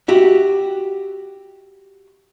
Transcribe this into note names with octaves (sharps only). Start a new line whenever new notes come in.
F#4 G4 E5